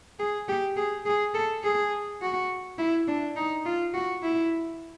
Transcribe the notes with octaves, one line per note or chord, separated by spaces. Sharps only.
G#4
G4
G#4
G#4
A4
G#4
F#4
E4
D4
D#4
F4
F#4
E4